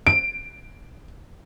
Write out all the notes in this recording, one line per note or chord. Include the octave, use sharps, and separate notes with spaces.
D7